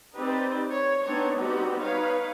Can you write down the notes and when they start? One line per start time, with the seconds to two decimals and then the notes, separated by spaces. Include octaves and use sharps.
0.15 C4 D#4 G4 B4 C5 D5
0.69 C#5
1.05 B3 C4 D4 D#4 C#5
1.38 G3 B3 C4 D#4 F#4 G4
1.79 D#4 B4 C#5 F5